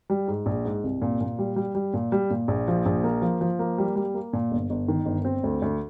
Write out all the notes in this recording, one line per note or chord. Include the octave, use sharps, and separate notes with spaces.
G3
G#2
A#1
G#2
C2
A#2
A#2
G3
G3
G3
A#2
G3
A#2
A#1
F3
A#1
A#3
F3
F3
A#3
G3
G3
A#3
A#2
G1
G1
D#3
G1
C4
D2
D2